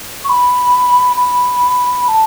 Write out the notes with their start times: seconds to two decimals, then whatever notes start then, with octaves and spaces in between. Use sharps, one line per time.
0.24 C#6
0.29 B5
1.16 B5
2.08 A5